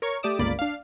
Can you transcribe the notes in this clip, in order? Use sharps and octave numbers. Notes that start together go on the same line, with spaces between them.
A#4 C#5 C#6
A3 G4 D5 D6 D#6 E7
G1 C#2 A#3 D5 B5 D6
D4 F5